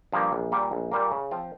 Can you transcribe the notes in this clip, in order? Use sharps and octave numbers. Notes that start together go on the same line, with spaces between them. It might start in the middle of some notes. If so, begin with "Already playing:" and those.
G2 F3 A#3
A#1
A#2 G3 A#3
A#1
A#2 G3 A#3
C#3
F3 C4 F4